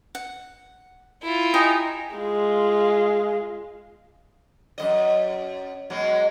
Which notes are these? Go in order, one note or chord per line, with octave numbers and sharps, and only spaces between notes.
F#5
E4 F4
D#4 G4 D#5 G#5
G#3 F4
F#2 G3 D#5
B2 F#3 G#3